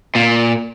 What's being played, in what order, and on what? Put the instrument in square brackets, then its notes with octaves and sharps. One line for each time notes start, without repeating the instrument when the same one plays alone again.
[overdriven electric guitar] A#2